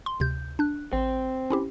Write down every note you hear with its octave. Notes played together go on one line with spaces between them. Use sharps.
C6
D2 C3 G6
D4 F#6
A1 C4
C#4 E4 G4